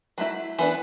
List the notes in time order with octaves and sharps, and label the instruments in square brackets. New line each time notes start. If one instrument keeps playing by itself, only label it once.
[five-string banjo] F#3 A3 E4
E3 B3 D4